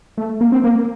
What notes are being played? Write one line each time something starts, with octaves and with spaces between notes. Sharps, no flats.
A3
A#3
C4
A#3